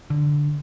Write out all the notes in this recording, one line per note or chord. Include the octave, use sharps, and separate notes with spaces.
D3